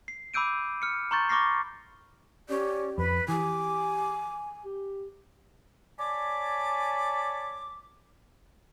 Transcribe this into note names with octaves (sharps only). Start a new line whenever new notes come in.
C7
B5 D6 E6 G6 D7 D#7
F6 C#7
A#5 C6 C#6 G6 A6
B5 C#6 D6 F6 A#6 C7
C#4 G4 D5
F2 B4 B5
E3 G4 G#5 D6
G4
C#5 D5 G#5 A5 B5 D6